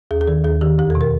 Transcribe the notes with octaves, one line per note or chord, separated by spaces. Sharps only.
D#2 G#4
G#4
D#3 A4
D#2 G#4
D#3 G4
E2 G4
A4
B2
A#4